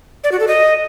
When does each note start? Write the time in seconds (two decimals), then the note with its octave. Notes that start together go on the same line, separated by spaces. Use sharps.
0.24 D5
0.32 F#4
0.40 A4
0.48 D#5